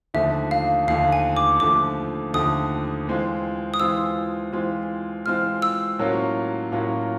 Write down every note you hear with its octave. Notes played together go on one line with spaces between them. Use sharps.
D#2 D3 F3 A3 E5
F5
D#2 D3 F3 A3 F5
G#5
D6
D#2 D3 F3 A3 D6
D#2 D3 F3 A3 D#6
E3 G#3 C4 F4
D#6
E3 G#3 C4 F4 E6
E3 G#3 C4 F4
E3 G#3 C4 F4 F6
E6
A2 F#3 A#3 C#4 F4
A2 F#3 A#3 C#4 F4